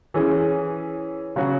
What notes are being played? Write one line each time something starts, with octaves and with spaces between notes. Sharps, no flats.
E3 C#4 G#4
C#3 F#3 C#4 F#4